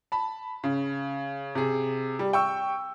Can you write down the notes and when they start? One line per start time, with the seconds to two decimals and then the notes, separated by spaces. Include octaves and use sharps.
0.12 A5 B5
0.64 C#3
1.55 C3 G#4
2.19 G3
2.33 G5 C#6 E6